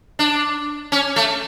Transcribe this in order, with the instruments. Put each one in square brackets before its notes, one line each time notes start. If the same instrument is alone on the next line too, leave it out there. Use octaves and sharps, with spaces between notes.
[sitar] D4
C#4
A3